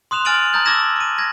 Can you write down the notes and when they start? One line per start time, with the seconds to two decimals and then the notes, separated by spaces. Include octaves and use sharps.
0.11 C6 D#6 F#6 E7 F7
0.25 G#5 F6 A6 D7 D#7 F#7
0.53 A5 A#5 D#6 G6 A6 F#7
0.65 D6 E6 G#6 A#6 E7
0.96 D6 D#7
1.18 G#6 A#6